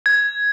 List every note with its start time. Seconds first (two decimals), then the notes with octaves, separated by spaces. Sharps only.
0.06 G#6